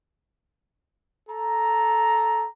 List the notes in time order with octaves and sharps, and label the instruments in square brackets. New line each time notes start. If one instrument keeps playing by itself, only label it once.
[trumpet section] A4 A#5